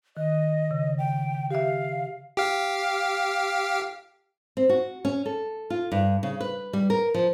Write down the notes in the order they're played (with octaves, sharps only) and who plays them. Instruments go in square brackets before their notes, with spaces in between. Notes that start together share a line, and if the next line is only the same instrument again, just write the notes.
[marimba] D#3 [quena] D#5
[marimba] C#3
[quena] G5
[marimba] G4 E5 [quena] F5
[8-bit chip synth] G4 F5
[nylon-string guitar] C4
F#4
C#4
A4
F4
G2
C#3
B4
G3
A#4
F3